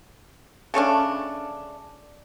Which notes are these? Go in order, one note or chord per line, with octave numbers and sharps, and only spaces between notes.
C#3 A3 C#4 D4